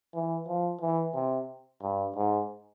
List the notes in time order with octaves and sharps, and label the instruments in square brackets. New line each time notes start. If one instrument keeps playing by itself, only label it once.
[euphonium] E3
F3
E3
C3
G2
G#2